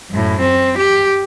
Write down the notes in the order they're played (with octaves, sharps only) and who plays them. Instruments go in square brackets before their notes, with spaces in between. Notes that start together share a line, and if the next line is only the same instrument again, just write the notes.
[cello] F#2 A2
C4
G4